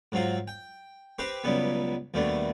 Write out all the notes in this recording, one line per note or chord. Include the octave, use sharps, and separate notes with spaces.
G#2 F#3 C4 F4
G5
C4 G4 B4 C5 D6
C#2 B2 F#3 G3 B3
D#2 B2 G3 A3 D4